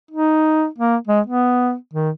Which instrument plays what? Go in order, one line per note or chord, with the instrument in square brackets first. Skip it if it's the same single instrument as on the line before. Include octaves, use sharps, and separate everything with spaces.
[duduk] D#4
A#3
G#3
B3
D#3